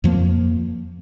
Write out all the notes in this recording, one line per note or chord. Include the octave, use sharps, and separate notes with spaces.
F2 F3 A#3